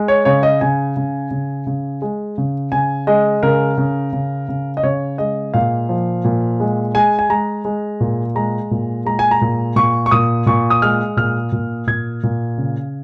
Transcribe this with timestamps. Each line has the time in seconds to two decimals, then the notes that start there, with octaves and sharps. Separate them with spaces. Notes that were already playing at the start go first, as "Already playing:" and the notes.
Already playing: G#3
0.08 C#5
0.25 C#3 C#5
0.43 D#5
0.61 C#3 G#5
0.97 C#3
1.31 C#3
1.67 C#3
2.02 G#3
2.38 C#3
2.72 C#3 G#5
3.07 G#3 D#5
3.43 C#3 A#4
3.78 C#3
4.13 C#3
4.49 C#3
4.77 D#5
4.83 C#3 C#5
5.18 G#3 D#5
5.54 A#2 F5
5.89 F3
6.25 A#2
6.60 G#3
6.94 G#3 G#5
7.19 G#5
7.30 G#3 A#5
7.65 G#3
8.00 A#2
8.35 G#3 A#5
8.71 A#2
9.05 G#3 A#5
9.19 G#5
9.31 A#5
9.41 A#2
9.76 A#2 C#6
10.06 C#6
10.11 A#2 D#6
10.46 A#2 C#6
10.70 D#6
10.82 G#3 F6
11.17 A#2 F6
11.52 A#2
11.87 A#2 G#6
12.23 A#2
12.58 C#3